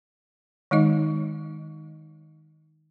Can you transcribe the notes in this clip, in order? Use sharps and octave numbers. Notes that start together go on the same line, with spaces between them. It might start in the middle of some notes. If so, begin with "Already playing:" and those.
D#3 G#3 D#4 D#5